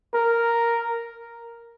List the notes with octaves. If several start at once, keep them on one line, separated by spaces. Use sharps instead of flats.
A#4